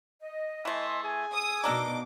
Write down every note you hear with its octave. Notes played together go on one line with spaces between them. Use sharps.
D#5
E3 A3 E5 G#5 C6
G#4 G#5
D#6 E6
B2 A#3 D4 D#4 D6